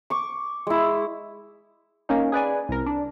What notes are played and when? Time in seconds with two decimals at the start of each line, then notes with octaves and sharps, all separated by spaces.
0.10 C#6 D6
0.67 G#3 E4
2.09 A#3 C#4 D#4
2.32 G#4 B4 D5 G#5
2.69 C2 A#4
2.86 D4